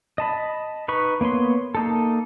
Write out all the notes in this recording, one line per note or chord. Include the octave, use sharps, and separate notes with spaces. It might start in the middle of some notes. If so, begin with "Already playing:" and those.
D#5 A5 B5
D#4 B4 B5 C#6
A#3 B3 C#5 C6
A#3 D#4 A4